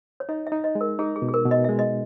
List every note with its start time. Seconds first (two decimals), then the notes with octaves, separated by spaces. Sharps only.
0.20 C#5
0.29 D#4 D#5
0.47 E5
0.52 D#4
0.64 D#5
0.75 G#3
0.81 A#4
0.99 D#4 G#4
1.16 G#4
1.22 B2
1.29 G#4
1.34 A#4
1.45 B2
1.51 D#5
1.64 G#3 E5
1.79 D#5